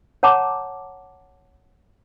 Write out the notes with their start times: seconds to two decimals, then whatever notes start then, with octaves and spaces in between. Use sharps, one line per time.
0.23 C#5 F#5 A5 A#5 D6